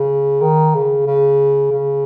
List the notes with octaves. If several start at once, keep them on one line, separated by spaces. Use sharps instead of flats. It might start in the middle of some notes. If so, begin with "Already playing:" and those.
Already playing: C#3
D#3
C#3
C#3
C#3